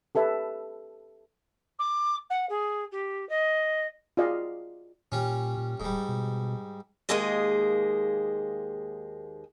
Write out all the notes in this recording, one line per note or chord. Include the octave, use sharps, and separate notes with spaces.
G4 A4 B4 E5
D6
F#5
G#4
G4
D#5
F4 F#4 G#4 D5 D#5 F5
A#2 G3 C#4
A#2
D1 G#2 G3
B2
D#2 G#3 A#3 G#4 C5 D#5